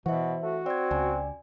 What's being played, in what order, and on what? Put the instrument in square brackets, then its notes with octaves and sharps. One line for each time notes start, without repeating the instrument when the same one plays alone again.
[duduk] B2 [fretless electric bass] E3 [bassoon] F#4 [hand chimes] C5 E5
[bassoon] A3 [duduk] F#4
[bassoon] C4 [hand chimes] D5 G#6
[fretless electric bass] C#2 [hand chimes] D5 G#5